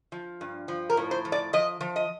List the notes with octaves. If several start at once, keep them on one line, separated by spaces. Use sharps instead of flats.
F3
G2
F3
A#4
A2
C5
F3
D5
F3 D#5
F3
D#5